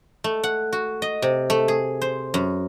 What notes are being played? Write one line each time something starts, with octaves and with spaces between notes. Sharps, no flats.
A3
F#5
F#4
D#5
C3
A3
G#4
C5
F#2